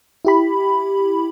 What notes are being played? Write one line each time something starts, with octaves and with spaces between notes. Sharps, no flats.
E4 G4 B5